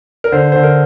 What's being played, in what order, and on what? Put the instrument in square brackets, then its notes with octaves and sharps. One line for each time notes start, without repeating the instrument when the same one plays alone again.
[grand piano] A#4
D3 C5
D3 C5
A#4